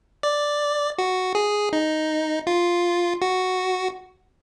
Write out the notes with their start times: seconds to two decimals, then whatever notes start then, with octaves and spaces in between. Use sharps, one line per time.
0.23 D5
0.98 F#4
1.35 G#4
1.73 D#4
2.47 F4
3.22 F#4